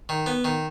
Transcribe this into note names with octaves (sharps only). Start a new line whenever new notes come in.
D#3
B3
D#3